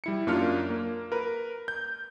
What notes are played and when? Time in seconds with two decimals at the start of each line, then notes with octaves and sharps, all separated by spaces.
0.04 G3 E4 C#7
0.27 F#2 A#3 D4 F4 F6
0.70 A#3
1.12 A#4 B4
1.68 G6